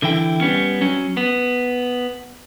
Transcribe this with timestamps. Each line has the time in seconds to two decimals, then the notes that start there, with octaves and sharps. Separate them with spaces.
0.02 D3 E3 E4 G5
0.41 G3 B3 C#4
0.81 F#3 C#4
1.17 B3